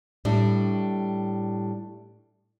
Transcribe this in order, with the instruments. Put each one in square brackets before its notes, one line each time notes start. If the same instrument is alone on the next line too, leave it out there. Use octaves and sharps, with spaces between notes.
[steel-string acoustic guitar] A2 G3 D4